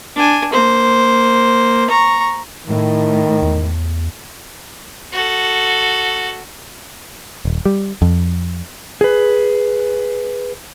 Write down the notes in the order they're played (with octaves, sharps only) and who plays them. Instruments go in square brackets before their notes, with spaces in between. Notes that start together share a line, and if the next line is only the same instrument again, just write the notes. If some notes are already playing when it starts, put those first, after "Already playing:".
[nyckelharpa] D4 G#5
A#3 C5
A#5 C#6
[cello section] A2 [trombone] D#3
[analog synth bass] E2
[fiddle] F#4 A4
[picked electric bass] D#1
G3
F2
[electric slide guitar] G#4 B4